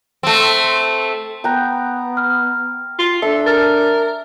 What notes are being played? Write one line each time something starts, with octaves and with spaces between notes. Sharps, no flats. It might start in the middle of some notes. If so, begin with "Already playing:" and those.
A3 C4
B3 G5 A5 A#5 F#6 G6
F6
F4
D4 A4 E5
A#4 F6 A6